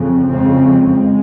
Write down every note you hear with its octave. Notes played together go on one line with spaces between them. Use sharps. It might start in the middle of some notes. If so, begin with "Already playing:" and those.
Already playing: F2 C#3
F2 C#3 F3 G#3 C4
G#3